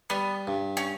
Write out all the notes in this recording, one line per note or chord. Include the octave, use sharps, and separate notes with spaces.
G3 B3
G2
C#4